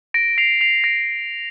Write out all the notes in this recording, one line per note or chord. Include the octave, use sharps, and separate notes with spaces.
A#6 D7
C7 F7
C7 F7
A#6 D7